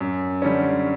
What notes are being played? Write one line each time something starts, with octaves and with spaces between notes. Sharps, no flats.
F#2
D3 G3 C#4